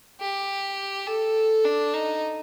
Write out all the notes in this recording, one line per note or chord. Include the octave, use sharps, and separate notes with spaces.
G4
A4
D4
D#4